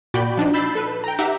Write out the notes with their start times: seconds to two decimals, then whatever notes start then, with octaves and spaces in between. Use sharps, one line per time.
0.14 A#2 F#4 D5 G5 B5 G6
0.37 F3 D4 D#4
0.53 B5 E6 G6 A6 C7
0.75 A4 B4
1.04 G5 A#5
1.19 D#4 G4 E5 F#5 A#5 D6